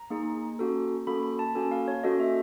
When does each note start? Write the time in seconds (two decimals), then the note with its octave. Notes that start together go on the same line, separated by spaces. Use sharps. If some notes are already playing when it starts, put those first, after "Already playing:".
Already playing: A#5
0.10 A#3 D#4 G#4
0.59 A#3 C#4 F#4 A4
1.07 A#3 C#4 F#4 A4 B5
1.23 B5
1.39 A5
1.55 A#3 C#4 F#4 A4 G#5
1.72 F5
1.88 C#5
2.03 A#3 C#4 F#4 A4 D#5
2.20 E5